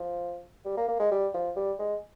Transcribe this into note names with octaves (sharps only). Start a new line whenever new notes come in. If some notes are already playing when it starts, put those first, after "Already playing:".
Already playing: F3
G3
A#3
A#3
G#3
G3
F3
G3
G#3